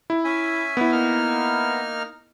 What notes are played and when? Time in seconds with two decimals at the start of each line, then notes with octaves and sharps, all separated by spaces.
0.10 E4
0.24 C#4 E5 G#5
0.77 B3 E4
0.92 A#3 D#4 F6